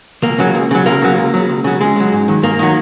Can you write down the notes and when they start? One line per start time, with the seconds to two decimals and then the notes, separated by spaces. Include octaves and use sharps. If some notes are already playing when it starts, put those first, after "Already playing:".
0.23 C#2 A#3
0.38 C#3 F#3
0.55 C#2
0.71 C#3 F#3
0.86 C#2 A#3
1.02 C#3 F#3
1.18 C#2
1.34 C#3 F#3
1.49 C#2
1.64 C#3 F#3
1.80 C#2 G#3
1.96 C#3 F#3
2.13 G#2
2.28 D#3 F#3
2.43 G#2 A#3
2.59 D#3 F#3